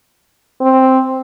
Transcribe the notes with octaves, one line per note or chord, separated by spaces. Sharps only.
C4